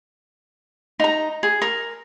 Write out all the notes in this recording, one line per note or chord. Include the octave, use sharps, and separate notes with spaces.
D#4 A#5
G#4
A#4